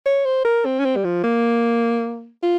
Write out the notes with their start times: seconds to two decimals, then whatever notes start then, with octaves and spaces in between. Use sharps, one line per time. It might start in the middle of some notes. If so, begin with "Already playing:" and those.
0.06 C#5
0.25 C5
0.45 A#4
0.65 C4
0.79 C#4
0.85 C4
0.96 G3
1.05 F3
1.23 A#3
2.43 F4